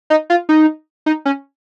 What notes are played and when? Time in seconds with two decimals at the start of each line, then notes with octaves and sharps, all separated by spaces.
0.10 D#4
0.30 F4
0.49 D#4
1.06 D#4
1.25 C#4